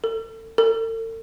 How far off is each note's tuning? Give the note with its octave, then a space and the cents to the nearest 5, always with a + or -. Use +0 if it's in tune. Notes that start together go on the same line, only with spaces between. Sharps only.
A4 +40
A4 +45